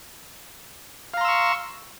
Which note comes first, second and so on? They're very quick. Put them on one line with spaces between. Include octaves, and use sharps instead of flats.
F5 A#5 C6 E6 C#6